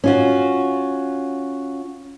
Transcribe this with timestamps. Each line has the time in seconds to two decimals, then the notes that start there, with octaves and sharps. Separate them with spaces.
0.04 C#4 F4 F#4